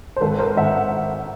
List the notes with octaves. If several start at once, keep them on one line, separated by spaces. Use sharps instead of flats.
C5
G#1 A4 B4
A#4 C5
G#1 E5 F#5